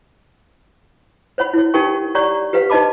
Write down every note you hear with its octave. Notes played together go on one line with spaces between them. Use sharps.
C5 C#5 F#5 B5
E4 C#5
D#4 G4 A#4 F#5 G5 C#6
G4 C#5 D5 F#5 A#5 C#6
G4 B4 C5 F5 F#5
D#4 C5 D#5 A5 B5 D6